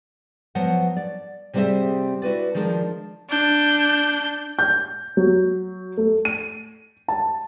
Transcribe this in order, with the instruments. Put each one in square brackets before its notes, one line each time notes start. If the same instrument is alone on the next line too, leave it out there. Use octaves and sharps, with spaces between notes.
[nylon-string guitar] F3 F#3 B3 F#5
D5
C3 G3 C4 G#4 C5 E5
E4 F#4 B4 D5
D#3 F3 G#3 D4 A#4
[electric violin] D4 G6
[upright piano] G6
F#3
A3
D#7
A5